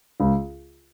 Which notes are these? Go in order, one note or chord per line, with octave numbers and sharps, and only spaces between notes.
C#2